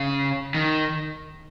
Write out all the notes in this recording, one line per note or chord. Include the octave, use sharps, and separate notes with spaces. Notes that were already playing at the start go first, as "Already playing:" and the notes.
Already playing: C#3
D#3